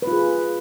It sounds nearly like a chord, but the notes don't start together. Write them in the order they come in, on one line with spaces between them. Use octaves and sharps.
B4 F4 G#4